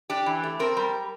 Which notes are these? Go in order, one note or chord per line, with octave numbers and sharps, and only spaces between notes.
D4 G4
E3
A3
C4 A#4
G3